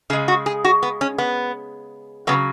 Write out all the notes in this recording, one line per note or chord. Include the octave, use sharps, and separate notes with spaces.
C#3 G#3 G#4
F#4
G#4
F#4
B3
C#4
B3
C#3 F#3 B3